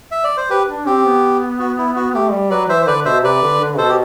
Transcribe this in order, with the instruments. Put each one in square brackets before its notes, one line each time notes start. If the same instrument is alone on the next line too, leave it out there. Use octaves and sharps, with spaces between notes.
[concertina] E5
D5
C5
G4 B4
[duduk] D4
[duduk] C4 [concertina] G4
[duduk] B3
[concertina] F#4
E4
F#4
[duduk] A3 [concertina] G4
[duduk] G3
[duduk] F#3 [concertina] B4 D5
[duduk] E3 [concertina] C5 E5
[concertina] C5
[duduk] D3 [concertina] B4 D5
[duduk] B2 [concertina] C5 E5
[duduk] C3 [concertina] B4 D5
[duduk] D3
D3
[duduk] B2 [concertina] A4 C5
[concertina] G4